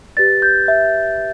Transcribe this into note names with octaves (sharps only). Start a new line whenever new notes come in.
G4 B4 D5 A6
G6
E5